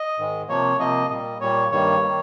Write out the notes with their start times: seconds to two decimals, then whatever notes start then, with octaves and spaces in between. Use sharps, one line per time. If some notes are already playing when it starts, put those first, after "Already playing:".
Already playing: D#5
0.19 G#2 D#3 G#3
0.48 C3 F3 A#3 C#5
0.79 C3 F3 A#3 D#5
1.10 A#2 G3 A#3 D#5
1.41 A#2 G3 A#3 C#5
1.71 G2 D#3 G3 A#3 C#5
2.02 D#3 G3 A#3